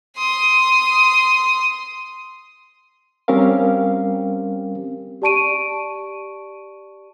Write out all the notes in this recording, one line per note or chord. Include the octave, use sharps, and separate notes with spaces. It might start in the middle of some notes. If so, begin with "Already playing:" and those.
C6 D#6
G3 C4 C#4 G4 A#4 F5
G4 D5 A5 C#6 D7 D#7